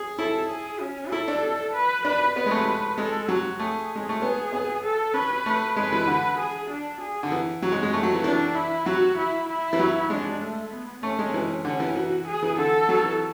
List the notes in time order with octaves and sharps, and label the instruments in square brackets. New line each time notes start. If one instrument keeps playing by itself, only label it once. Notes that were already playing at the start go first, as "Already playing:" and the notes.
Already playing: [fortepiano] G#4
[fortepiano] E4 [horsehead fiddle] A4
[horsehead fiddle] G#4
C#4
[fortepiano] E4 [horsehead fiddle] A4
[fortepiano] D4
[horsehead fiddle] B4
[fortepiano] D4 [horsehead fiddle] B4
[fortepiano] B3 [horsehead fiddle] B4
[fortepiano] G#3
A3
[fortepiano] G#3 [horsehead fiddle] A4
[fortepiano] F#3 [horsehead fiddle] F#4
[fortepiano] A3 [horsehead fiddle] G#4
[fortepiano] G#3
A3
[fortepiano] B3 [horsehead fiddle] G#4
[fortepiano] B3
[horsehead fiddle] A4
[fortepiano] C#4 [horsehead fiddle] B4
[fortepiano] A3
[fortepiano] G#3 [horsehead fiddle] B4
[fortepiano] E3
D3
[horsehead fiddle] G#4
D4
G#4
[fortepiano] D3
E3
F#3
G#3
G#3
A3
F#3
E3
[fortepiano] E3 [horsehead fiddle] D4
[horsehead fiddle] E4
[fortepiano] F#3 [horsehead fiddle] F#4
[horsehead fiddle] E4
E4
[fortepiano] E3
F#3
[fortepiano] G#3 [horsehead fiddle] D4
[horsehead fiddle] A3
B3
[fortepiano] A3 [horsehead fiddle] C#4
[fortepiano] G#3
E3
[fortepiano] D3 [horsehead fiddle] C#4
[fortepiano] E3
[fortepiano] E3 [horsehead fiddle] F#4
[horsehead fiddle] G#4
[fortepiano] E3
[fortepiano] D3 [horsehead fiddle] A4
[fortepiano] F#3
E3